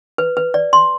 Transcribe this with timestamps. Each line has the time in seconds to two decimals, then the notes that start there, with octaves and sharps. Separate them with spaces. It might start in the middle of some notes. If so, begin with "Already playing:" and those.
0.18 B4
0.37 B4
0.54 D5
0.73 C6